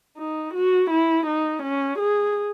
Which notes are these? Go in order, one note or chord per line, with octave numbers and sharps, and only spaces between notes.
D#4
F#4
E4
D#4
C#4
G#4